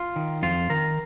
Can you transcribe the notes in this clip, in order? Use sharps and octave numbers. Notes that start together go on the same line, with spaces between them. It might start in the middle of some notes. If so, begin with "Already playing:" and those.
Already playing: F4
D#3
F2 F4
D#3 A#4